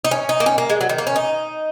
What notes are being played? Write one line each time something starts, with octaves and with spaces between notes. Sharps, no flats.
D#4
C#4
D#4
A#3
C#4
A#3
G#3
F#3
D#3
A#3
C#4
D#4